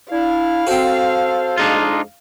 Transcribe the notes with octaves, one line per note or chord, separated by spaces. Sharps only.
D4 E4 F5
C4 F#4 A4 C5
F2 G#3 D4 D#4 F4 G#4